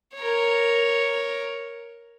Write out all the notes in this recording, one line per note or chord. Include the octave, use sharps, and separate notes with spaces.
A#4 C#5